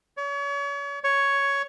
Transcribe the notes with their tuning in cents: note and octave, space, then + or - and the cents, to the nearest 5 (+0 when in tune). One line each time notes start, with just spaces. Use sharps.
C#5 +35
C#5 +5